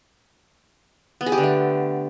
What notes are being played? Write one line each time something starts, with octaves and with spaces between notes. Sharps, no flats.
B3
G#4
G4
D3
A3